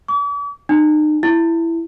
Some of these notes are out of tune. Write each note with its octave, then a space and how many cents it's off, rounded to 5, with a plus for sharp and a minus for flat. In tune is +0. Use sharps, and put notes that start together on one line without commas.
D6 -45
D#4 -35
E4 +10